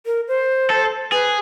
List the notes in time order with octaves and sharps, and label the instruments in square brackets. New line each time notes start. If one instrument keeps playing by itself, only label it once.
[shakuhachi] A#4
C5
[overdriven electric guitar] A4
[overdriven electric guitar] G#4 [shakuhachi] B4